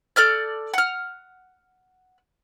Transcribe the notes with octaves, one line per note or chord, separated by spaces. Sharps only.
A4 D5 F6 G6
F#5 F6